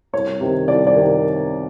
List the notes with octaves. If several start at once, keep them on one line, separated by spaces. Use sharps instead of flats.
C2 C#5
C3 D#3
C2 D5
D5
C3 D#3